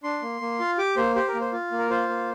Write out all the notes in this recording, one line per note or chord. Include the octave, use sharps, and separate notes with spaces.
D4 C6
A#3
A#3
F4
G4 D6
A#3 C5
G4 C5
A#4
A#3
C5
F4
A#3
A#4
F4 C5
A#3